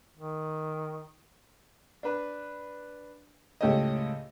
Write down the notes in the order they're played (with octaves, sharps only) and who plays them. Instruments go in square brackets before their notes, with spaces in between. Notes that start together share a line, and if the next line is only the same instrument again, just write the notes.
[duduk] D#3
[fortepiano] D4 B4
C#2 A2 G4 A4 C#5 D#5